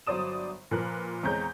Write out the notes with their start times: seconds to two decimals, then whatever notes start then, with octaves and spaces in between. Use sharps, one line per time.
0.07 G1 F#3 C5 D5 D#6 E7
0.71 A#2 F3 A#4 B4 F#6
1.23 E2 G#3 C4 C#5 A#5 G6